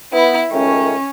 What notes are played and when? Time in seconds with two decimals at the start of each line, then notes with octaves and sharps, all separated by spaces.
0.12 B3 E4
0.52 C#2 D#3 A3 C#4